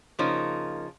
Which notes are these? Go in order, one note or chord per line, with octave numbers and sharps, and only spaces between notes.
C#3 F3 A#3 D#4